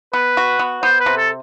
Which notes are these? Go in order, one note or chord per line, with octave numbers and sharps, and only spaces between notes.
B3 B4
F#4
B3
B3 C5
B4
C3
A4